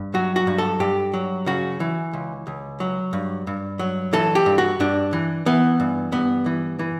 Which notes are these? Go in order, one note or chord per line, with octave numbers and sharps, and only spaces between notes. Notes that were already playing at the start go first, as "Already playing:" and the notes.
Already playing: G2
F#3 F#4
F#4
G2
A4
G2 G4
F#3
C#3 F#4
E3
C#2
C#2
F#3
G2
G2
F#3
E3 A4
G4
G2
F#4
G2 D4
E3
E3 B3
G2
G2 B3
E3
E3